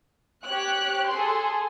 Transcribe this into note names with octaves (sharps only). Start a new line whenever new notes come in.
G4 C#5 F#6
G#4 A4 C6